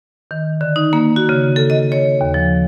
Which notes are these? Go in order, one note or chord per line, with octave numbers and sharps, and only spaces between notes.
D#3
D3
D#4
A#3
F#4
C#3
A4
D#5
C#5
D#2
F3